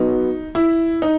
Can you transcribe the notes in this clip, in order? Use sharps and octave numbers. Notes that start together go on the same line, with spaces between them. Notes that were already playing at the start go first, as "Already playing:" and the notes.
Already playing: F#3 B3 D#4 F#4
E4
D#4